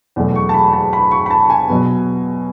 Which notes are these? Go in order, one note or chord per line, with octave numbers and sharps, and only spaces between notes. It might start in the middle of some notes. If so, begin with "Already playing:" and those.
E2 B2 F#3 A3
C#6
A5
B5
A5
B5
C#6
B5
A5
G#5
B2 F#3 B3